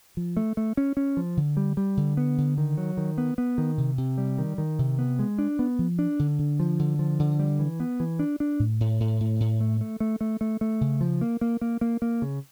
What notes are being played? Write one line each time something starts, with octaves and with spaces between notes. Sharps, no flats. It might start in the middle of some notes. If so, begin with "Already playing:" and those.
F3
A3
A3
C#4
C#4
F3
D3
G3
G3
D3
B3
D3
D#3
F#3
D#3
B3
B3
D#3
C3
C3
G3
D#3
D#3
C3
B3
G#3
D4
B3
F3
D4
D3
D3
F3
D3
F3
D3
G3
E3
B3
E3
D4
D4
A2
A2
A2
A2
A2
A3
A3
A3
A3
A3
A3
C#3
F3
A#3
A#3
A#3
A#3
A#3
C#3